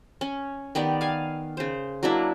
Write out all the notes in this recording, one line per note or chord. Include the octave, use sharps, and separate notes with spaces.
C#4
D#3 B3 G4 D5
F5 G#5
C#3 C5
F#3 A#3 D4 E4